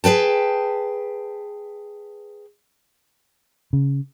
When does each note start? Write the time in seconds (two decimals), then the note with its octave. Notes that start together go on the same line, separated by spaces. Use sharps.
0.04 G#4 B4 G5 A5
3.73 C#3